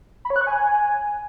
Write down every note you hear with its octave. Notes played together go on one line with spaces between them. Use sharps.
B5
C#5
F#6
C#6
G#5